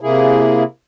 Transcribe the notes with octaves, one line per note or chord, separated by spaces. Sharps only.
C3 A#3 E4 G#4